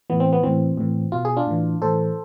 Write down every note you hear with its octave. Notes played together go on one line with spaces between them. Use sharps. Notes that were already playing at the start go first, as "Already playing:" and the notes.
A2 E3 B3
C4
B3
A2 E3 C4
A2 E3
B2 F4
G#4
D4 F4
A2 E3
A2 E3 A4 C5